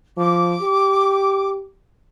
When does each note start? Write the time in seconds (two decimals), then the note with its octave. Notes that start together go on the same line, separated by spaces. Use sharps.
0.17 F3 D6
0.62 G4